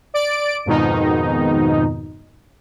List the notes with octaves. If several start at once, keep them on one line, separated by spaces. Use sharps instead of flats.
D5 D7
F2 G#2 B2 D#3 D#4